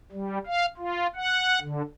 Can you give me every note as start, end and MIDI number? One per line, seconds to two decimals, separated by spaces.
0.12 0.38 55
0.47 0.66 77
0.77 1.07 65
1.16 1.59 78
1.61 1.82 50